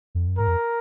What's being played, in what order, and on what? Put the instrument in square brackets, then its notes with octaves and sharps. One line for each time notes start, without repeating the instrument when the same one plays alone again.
[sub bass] F2
F#2
[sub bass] G#2 [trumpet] A#4
[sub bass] F2